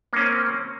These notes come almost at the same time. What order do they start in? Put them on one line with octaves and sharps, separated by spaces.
A#3 C#4 C4